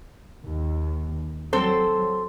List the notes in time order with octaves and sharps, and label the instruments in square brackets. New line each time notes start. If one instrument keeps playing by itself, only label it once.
[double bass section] D#2
[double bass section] F#3 [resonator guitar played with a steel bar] C4 A4 C5